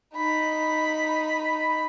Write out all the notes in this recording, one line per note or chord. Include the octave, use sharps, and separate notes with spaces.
D#4 B5